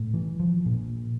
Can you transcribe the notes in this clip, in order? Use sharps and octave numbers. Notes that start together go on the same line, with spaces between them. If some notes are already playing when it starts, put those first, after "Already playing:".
Already playing: A2
E3
F3
A#2